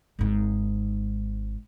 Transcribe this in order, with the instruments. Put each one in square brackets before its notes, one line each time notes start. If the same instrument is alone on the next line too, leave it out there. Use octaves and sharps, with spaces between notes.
[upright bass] G#1 G#2